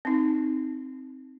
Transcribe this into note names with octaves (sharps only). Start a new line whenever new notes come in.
C4 D#4